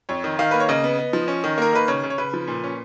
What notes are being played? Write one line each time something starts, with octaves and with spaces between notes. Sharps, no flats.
F2 C#5
D#3
D#3 F5
A#3 B4
C#5
C#3 D#5
B3
B3
F3
C#4
D#3
A#3 A#4
D#3 B4
C#3 C#5
C#3
C#5
C#3 B4
F3
A#2
C#4